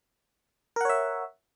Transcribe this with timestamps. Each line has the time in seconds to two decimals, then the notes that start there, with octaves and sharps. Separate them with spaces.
0.76 A#4
0.81 F#5
0.85 C#5
0.89 E5